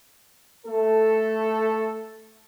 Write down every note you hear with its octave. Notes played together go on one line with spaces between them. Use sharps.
A3 A4